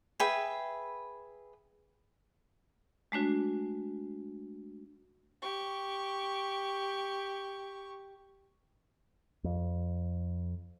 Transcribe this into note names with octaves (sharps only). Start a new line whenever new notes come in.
G#4 B4 E5 G5
G#3 A3 D4 F#4
G4 C#6
F2